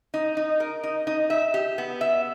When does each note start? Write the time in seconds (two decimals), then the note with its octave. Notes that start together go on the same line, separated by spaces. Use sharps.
0.14 D#4
0.37 D#4
0.60 A#4
0.83 D#4
1.07 D#4
1.30 E5
1.54 G4
1.78 B3
2.01 E5